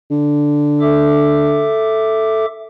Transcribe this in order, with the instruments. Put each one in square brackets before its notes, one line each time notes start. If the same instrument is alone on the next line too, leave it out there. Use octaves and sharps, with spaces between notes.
[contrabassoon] D3
[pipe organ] A4 E5 D6